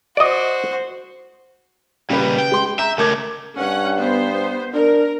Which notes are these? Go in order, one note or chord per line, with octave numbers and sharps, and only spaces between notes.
F#4 C5 D5 D#5
A#2 C#3 G3 B4
G5
G#3 C6
E5 A#5 G6
C#2 A3 A#4 D6 G#6
G2 C#4 F#5
B3 C5
D4 A#4